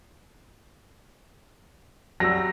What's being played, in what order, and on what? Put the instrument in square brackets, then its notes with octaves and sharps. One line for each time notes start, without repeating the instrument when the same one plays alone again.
[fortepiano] F#3 G3 [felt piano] E6 A#6